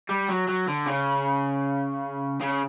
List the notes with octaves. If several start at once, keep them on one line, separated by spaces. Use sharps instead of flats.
G3
F#3
F#3
D3
C#3
C#3